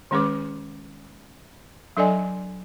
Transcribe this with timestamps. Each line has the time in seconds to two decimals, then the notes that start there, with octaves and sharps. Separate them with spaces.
0.11 D#3 G#3 C#4 G#4 B4 D6
1.97 F#3 D4 A4 D5 D#5 G#5